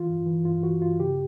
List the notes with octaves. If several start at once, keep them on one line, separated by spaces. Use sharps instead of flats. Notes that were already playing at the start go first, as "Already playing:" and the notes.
Already playing: E3 F4
G2
E3
G2 F4
E3 F#4
G2 F4
C#3 G4